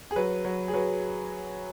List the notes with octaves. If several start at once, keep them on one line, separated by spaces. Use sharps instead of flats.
G#4
F#3 B4
F#3
G#4
F#3 B4